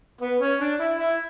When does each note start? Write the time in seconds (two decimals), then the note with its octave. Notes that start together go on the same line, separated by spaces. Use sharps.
0.21 B3
0.41 C#4
0.61 D4
0.80 E4
0.99 E4